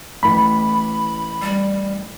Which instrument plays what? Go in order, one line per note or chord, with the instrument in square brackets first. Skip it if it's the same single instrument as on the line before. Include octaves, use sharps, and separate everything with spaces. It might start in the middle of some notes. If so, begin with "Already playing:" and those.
[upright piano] A1 A2 E3 [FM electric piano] B5
[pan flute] G3